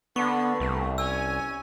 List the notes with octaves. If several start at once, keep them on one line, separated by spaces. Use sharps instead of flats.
D3 B3 C#6
C2 A3
C#4 G#5 E6